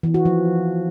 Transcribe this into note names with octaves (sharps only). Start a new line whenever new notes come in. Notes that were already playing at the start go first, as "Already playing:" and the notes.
E3
F#4
F3